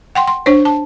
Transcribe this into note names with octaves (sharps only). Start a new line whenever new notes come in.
F#5 G5 C6
C6
D4 C5 C#5
A5